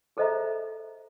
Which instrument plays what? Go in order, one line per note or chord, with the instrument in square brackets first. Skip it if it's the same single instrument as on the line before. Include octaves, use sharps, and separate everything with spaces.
[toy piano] G#4 A4 C5 D#5 E5 A#5